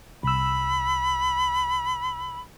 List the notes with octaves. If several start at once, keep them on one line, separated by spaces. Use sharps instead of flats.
C2 B5 E6